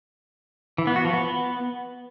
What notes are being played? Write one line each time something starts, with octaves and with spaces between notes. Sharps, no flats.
E3
B3
F#4
F3
B3